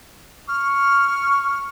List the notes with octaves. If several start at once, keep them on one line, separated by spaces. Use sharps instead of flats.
C#6 F6